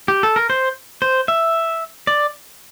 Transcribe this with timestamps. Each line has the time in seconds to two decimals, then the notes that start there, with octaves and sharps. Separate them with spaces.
0.08 G4
0.23 A4
0.36 A#4
0.50 C5
1.02 C5
1.28 E5
2.07 D5